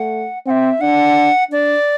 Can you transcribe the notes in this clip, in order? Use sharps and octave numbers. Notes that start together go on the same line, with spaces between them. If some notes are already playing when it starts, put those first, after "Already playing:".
Already playing: A3 F#5
C4 E5 F#5
D4 F#5
D4 D5